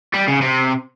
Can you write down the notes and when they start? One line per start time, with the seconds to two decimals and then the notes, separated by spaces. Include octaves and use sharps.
0.14 G3
0.28 C#3
0.42 C3